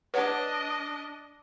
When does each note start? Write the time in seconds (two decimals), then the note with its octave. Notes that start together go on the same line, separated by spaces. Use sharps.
0.14 D4 B4 C#5 D#5 F#5